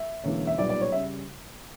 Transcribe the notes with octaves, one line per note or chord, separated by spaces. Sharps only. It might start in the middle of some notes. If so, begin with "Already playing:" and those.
Already playing: E5
E1 E2 D3 A#3 C#4
E5
B1 A#2 G3 B3 D5
D5
C#5
C#3 G3 E5